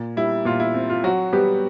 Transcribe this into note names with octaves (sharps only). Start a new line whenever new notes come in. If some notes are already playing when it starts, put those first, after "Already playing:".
Already playing: A#2
G3 E4
A#2 F4
E4
C4
F4
F#3 F#4
G3 B3 G4